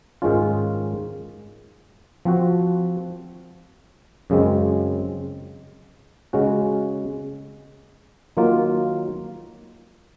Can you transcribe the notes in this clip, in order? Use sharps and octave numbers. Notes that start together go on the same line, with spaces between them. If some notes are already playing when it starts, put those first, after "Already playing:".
G#2 D#3 G#3 C#4 F4
F3 C4 F#4
F#2 C#3 G#3 C4
C#3 G#3 C#4 F#4
D#3 F#3 A#3 F4